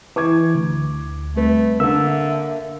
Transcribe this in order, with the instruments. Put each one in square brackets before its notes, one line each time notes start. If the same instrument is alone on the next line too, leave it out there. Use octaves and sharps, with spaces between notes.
[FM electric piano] E3 [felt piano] C#6 D6 G#6
[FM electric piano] D2
[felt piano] C2 B4 [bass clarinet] A3
[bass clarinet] D3 [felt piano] A#3 D4 [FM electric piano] E5